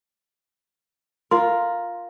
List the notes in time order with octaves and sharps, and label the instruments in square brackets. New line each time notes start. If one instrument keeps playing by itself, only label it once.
[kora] F4 A#4 [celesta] C6